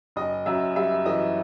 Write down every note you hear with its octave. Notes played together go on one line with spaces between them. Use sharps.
F#1 D#5
F#2 E5
G3 E5
E3 D#5